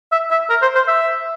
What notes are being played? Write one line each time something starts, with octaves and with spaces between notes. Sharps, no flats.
E5
E5
A#4
C5
C5
E5